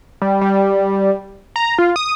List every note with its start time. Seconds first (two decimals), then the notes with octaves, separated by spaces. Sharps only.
0.22 G3
0.41 G3
1.56 A#5
1.78 F4
1.96 D#6